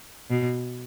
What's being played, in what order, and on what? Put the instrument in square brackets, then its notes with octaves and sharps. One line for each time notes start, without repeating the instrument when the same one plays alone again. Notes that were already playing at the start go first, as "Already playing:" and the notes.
[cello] B2